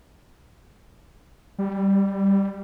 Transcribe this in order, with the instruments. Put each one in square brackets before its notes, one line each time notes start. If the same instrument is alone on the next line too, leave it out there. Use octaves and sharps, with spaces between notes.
[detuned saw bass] G3